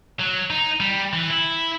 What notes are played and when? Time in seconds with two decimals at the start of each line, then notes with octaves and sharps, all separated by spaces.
0.20 F#3
0.50 D#4
0.80 G3
1.13 E3
1.30 E4